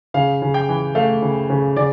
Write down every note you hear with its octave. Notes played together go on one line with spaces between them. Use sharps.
C#3 F5
C#3
G5
E3
A3 F5
C#3
C#3
C#3 D5